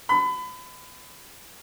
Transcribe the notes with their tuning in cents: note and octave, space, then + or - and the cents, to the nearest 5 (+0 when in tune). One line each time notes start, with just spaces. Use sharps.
B5 +30